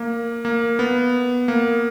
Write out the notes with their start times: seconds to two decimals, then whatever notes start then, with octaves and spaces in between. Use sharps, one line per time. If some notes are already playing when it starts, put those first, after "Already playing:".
Already playing: A#3
0.45 A#3
0.79 B3
1.48 A#3